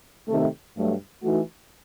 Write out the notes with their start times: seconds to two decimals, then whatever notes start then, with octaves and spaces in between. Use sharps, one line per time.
0.28 C3 D#3 A3
0.76 G2 F#3 A3
1.22 E3 A3 D#4 F#4